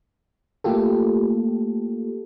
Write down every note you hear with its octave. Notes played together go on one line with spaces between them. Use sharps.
A3 A#3 F4 G4 A4